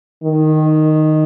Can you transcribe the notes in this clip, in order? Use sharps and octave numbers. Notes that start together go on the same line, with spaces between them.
D#3